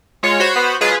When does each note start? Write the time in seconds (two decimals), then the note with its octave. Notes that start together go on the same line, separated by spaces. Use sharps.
0.23 G#3 F4 C#5
0.40 F#4 C5 B5
0.55 B3
0.81 F#3 G#3 F4 G#4 B4